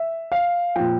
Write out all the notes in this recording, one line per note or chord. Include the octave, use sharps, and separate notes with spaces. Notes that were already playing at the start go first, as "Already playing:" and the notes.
Already playing: E5
F5
A#2 F3 G5